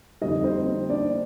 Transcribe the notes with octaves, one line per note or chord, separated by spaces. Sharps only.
F2 D3 G3 D#4 D#5
C4 C5
C4 C5
D4 D5